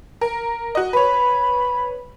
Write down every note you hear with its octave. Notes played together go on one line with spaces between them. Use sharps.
A#4
F#4 D#5
B4 C#5 B5